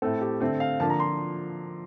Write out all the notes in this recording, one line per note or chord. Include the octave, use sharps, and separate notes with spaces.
A2 A3 C4 A4
G4
D3 A3 C4 A4
F5
D3 F3 A#3 A5
A#5
C6